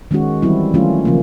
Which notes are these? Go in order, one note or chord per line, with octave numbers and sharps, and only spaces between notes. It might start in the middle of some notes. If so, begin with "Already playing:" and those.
D#3 G#3 C#4 F#4
E3 G3 C4 E4
D#3 F#3 A3 C#4 F4
C#3 F3 A#3